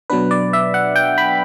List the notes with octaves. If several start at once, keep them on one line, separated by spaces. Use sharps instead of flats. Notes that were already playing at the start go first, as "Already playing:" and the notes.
B2 F#3 B3 D4 B4
D5
E5
F#5
G5
B5